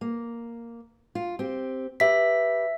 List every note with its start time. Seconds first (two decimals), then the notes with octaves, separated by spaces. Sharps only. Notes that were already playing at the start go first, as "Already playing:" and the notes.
0.01 A#3
1.15 F4
1.39 C4 G4
2.00 G4 B4 E5 B6